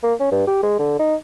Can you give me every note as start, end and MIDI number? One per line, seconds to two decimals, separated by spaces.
0.03 0.14 58
0.20 0.31 61
0.32 0.45 43
0.47 0.59 67
0.63 0.78 56
0.79 0.99 50
0.99 1.15 63